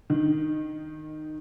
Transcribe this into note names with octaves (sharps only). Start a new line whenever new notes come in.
D#3